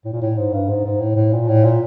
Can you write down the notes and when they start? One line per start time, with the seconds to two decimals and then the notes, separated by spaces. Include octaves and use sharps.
0.05 A2
0.13 A#2
0.22 A2
0.38 G#2
0.53 G2
0.69 G#2
0.85 G#2
1.01 A2
1.16 A2
1.33 A#2
1.48 A2
1.64 A#2